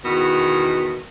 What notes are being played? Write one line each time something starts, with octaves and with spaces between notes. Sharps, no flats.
E2 B2 D#3